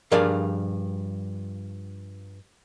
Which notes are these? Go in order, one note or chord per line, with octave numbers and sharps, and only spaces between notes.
G2 F3 G#4 A#4 D5 F5